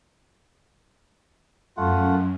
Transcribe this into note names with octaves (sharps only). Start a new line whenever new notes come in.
F#2 A3 F4 F#5